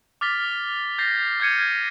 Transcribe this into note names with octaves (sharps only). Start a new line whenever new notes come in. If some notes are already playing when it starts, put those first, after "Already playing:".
D6 F6 A6 B6 G7
G6 A6 A#6 C7
F6 G6 G#6 C#7 D#7